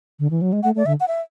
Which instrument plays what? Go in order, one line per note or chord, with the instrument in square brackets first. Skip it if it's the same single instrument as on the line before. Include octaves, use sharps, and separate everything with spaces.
[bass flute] D3
E3
F#3
G#3
[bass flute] A3 [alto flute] F#5
[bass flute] A3 [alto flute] D5
[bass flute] D3 [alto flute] E5
[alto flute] F#5
E5